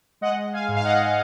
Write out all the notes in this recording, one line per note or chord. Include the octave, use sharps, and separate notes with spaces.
G#3 D#5 F#5
F5 G#5
G#2
F5
D#5 F#5